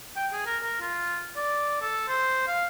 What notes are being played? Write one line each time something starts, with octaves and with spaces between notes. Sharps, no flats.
G5
G#4
A#4
A#4
F4
D5
A4
C5
F5